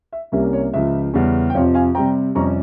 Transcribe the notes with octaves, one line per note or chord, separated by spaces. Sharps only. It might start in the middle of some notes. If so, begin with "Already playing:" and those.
E5
C2 C3 G3 A#3 C#4 E5
C#5
C#2 C#3 F3 E5
E2 C#3 G3 C#4
G5
F2 C3 F3 C4 C#5 F5
F5 G#5
C3 G3 C4 G5 A#5
F2 C3 G3 C#4 A#5 C#6